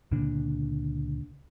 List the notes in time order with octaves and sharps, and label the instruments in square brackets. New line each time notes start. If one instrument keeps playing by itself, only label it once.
[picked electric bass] C#2 A#2 D3 D4